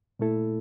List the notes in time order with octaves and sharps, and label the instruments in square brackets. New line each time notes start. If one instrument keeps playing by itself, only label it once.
[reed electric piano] A#2 A3 E4 A4